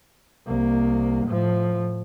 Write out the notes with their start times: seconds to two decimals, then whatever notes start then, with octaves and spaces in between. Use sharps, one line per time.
0.47 C2 A#3
1.25 A2 F3